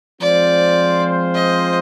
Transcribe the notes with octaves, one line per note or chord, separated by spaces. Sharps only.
F3 G#3 C4 F4 C5 D5
D#5